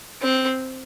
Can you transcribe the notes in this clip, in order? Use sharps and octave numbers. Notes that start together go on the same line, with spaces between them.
C4